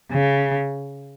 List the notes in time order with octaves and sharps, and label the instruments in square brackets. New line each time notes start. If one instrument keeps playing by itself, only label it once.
[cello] C#3